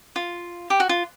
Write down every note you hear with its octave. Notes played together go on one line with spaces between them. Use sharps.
F4
G4
F#4
F4